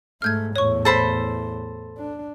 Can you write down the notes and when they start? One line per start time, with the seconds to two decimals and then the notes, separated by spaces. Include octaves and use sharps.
0.22 G#2 A3 F6 G6 G#6
0.56 E2 A2 C#5 C#6
0.85 A4 C5 B5
1.98 D4